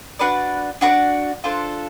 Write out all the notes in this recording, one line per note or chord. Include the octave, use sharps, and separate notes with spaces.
D4 F#4 B4 D5
D4 F#4 B4 D5
D4 F4 A4 C5